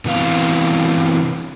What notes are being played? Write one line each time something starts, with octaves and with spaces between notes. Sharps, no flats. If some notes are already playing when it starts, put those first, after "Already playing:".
C3 E3 B3 F5